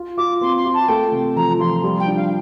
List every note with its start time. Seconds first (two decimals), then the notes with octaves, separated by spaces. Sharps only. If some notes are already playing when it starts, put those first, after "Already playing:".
Already playing: F4
0.17 F4 D6
0.41 C4 C6
0.56 C6
0.65 F4
0.73 A5
0.88 A3 G5
1.12 C3
1.36 F3 A#5
1.59 F3 C6
1.83 G3
2.00 G5
2.07 D4
2.16 F5